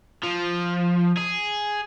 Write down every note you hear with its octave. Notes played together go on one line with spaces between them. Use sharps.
F3
G#4